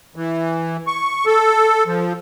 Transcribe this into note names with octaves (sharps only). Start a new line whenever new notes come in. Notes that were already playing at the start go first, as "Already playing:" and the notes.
E3
C#6
A4
F3